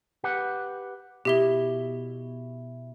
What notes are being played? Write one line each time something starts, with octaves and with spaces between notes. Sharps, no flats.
G4 B4 F#5
B2 E4 G4 E5 G7